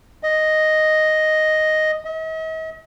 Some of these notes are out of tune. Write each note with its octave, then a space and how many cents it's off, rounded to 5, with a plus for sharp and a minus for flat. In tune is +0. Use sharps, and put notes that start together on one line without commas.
D#5 +0
D#5 +45